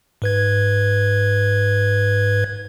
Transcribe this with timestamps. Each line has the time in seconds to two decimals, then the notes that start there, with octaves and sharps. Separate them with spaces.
0.22 G#2 B4 G#6